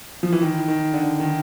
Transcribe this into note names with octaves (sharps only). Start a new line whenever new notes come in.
F3
E3
D#3
D#3
D3
D#3